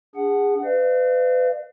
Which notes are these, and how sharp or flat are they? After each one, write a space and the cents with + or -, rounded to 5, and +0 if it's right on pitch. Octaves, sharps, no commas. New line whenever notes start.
D4 -25 G#4 -25 F#5 +5
B4 +40 D5 +45 F5 -25